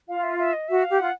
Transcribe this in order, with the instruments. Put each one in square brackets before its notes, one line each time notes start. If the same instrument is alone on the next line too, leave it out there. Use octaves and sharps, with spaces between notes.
[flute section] F4 [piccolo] F5
[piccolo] E5
E5
D#5
[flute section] F#4 [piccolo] E5
[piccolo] F5
[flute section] G4
[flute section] F4 [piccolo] F#5